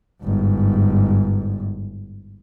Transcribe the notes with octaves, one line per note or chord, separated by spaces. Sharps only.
G1 G#2